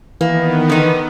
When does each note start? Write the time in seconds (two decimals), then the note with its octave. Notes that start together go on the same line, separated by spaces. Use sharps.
0.21 D#3 E3 A#3 B3
0.69 D3 D#4